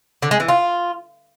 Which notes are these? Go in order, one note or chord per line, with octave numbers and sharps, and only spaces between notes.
D3
G#3
E3
F4